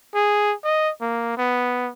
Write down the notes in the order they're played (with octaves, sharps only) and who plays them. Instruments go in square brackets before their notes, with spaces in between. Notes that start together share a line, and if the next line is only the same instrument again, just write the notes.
[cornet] G#4
D#5
A#3
B3